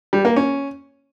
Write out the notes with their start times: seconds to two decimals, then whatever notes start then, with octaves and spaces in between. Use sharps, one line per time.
0.13 G3
0.25 A#3
0.36 C#4